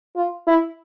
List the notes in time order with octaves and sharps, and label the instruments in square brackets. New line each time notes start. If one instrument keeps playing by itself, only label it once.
[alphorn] F4
E4